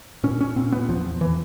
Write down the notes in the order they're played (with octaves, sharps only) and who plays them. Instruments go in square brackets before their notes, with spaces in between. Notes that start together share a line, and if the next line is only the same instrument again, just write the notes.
[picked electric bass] A#2 C#4
C#4
A#2 C4
B3
E2 F3
E3